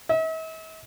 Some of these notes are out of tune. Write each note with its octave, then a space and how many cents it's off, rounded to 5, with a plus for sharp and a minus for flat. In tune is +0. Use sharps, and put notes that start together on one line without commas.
E5 -45